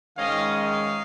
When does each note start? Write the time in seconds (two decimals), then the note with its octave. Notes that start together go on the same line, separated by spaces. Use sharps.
0.17 G#2 D#3 G#3 C#4 D#5 F5
0.53 D#5 F5